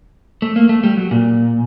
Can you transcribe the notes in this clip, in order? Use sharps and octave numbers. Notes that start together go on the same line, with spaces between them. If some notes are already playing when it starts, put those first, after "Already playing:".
A3
A#3
A3
G3
F#3
A#2